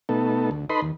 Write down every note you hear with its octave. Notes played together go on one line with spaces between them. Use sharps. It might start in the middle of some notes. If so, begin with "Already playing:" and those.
B2 A3 B3 D#4 A4
D2
D#4 A4 B4 D#5 B5 C6
D#2